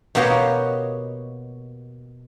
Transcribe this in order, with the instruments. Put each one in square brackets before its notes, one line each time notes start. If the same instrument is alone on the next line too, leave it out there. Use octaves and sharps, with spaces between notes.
[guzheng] B2 A#3 F#4 G4 C#5 D#5